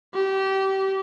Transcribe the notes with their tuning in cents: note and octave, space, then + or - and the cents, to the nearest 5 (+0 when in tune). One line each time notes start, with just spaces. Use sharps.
G4 -25